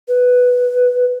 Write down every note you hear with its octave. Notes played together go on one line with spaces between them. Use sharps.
B4